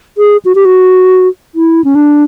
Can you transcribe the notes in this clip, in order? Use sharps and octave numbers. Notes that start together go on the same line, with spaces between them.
G#4
F#4
G4
F#4
E4
C#4
D4